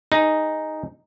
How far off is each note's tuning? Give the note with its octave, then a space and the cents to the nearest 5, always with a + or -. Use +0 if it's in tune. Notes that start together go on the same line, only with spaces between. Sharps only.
D#4 +0 G#4 +0